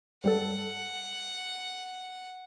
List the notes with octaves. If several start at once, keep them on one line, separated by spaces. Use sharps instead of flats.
G2 G3 A4 F#5